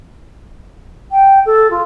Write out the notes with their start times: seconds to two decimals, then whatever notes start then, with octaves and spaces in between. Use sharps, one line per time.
1.11 G5
1.46 A4
1.70 F4